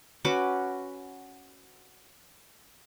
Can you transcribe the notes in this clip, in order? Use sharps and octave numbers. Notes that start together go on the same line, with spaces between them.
C#4 F#4 B4 D6